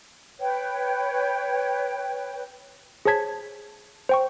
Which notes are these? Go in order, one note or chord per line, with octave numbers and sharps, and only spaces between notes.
B4 C#5 G5
G#4 C5 C#5 A5 G#6 B6
C5 G5 C#6